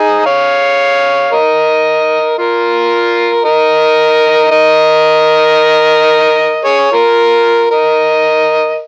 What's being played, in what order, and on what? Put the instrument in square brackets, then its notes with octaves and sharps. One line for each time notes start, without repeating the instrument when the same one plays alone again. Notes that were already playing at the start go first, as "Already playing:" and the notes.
Already playing: [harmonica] D#4 G#4
C#5 F5
A#4 D#5
F4 A#4
A#4 D#5
A#4 D#5
G#4 C#5
F4 A#4
A#4 D#5